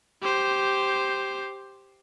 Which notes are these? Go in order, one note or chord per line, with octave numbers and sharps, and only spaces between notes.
G4 C5